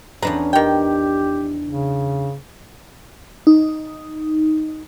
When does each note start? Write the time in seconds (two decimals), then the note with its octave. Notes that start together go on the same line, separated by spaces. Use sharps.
0.23 E2 C#4 D4 B4 A#5
0.53 D#3 G4 G5
1.66 C#3
3.47 D#4